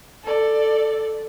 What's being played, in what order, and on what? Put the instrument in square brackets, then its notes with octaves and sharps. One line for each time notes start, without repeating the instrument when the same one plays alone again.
[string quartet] A4 D5